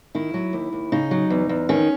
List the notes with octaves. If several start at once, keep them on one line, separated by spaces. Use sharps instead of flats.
D#3 E4
F#3
D#2
D#2
C#3 D#4
F#3
E2
E2
D#3 C#4